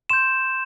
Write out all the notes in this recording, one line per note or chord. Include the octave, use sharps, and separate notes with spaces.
C6 G6 E7